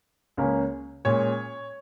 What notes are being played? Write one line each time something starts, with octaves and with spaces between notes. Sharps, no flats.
C#2 C#3 A#3 C#4
A#2 G#3 C#4 C#5